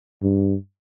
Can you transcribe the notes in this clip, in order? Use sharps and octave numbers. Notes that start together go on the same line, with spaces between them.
G2